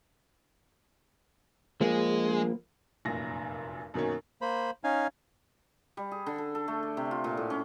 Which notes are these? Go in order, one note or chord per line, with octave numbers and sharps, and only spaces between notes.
F3 G#3 A#3
F1 F#2 A#2 A#6
F#2 B2 D#3 A#3 C#4
A#3 C5 B5
C#4 D#4 F5 G#5
G3
G#4
D3
A4
A4
A3
D5
C3
F4
A#2
A2
C#4